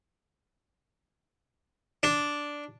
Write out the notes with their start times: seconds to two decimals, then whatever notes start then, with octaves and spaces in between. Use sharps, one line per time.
2.03 D4